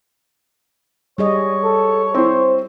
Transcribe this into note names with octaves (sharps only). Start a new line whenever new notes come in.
G3 G#4 C#5 D#5
A4
C4 E4 C5